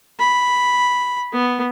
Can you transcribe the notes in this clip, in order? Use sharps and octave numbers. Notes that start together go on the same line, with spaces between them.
B5
B3